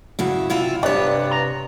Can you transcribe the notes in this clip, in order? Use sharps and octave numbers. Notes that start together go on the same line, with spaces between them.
G2 C#3 F#3 E4 F#5
C3 E4 F4
G2 C3 B3 C#5 D5
A#5